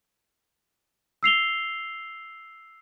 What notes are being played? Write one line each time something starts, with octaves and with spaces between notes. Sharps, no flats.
E6 C7 F7 G7